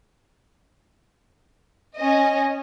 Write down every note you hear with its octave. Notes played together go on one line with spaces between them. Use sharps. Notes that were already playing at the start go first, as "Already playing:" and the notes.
C#4 D#5